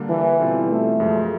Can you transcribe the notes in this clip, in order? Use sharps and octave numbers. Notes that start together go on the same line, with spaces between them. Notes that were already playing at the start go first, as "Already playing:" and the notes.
Already playing: D3 G3 A#3 D4
E3
B2 G3 C4 F4 A4
A3
F#2 C#3 F3 G#3